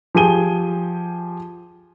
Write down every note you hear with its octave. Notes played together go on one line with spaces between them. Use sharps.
F3 G4 G#4 G#5 D#7 G7